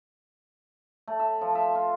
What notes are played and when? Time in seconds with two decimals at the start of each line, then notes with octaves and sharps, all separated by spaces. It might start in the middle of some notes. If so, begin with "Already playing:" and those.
1.08 A3
1.20 E5
1.41 F3
1.55 E5
1.75 F4